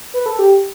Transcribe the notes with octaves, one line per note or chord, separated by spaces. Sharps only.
B4
A4
G4